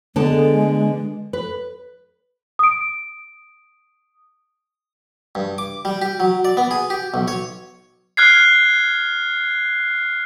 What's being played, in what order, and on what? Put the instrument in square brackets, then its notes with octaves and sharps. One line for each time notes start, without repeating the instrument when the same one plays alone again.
[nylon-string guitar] D3 B3 A5 [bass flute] G#3
[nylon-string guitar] B4
[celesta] D#6 D7
[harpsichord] G2
D6
G3
G4
F#3
D5
B3
G#4
G4
B1
C#5
[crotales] F6 F#6 G#6 C7